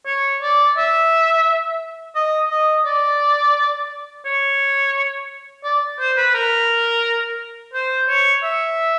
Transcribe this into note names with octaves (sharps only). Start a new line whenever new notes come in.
C#5
D5
E5
D#5
D#5
D5
C#5
D5
C5
B4
A#4
C5
C#5
E5